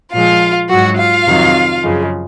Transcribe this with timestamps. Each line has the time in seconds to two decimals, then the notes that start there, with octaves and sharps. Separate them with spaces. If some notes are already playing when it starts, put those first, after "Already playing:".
0.13 A#2 F3 G#3 F4 F5
0.69 G#2 F#3 F#4 F#5
0.98 F4 F5
1.26 F2 C3 D#3 F#3
1.83 F#2 C#3 F3 G#3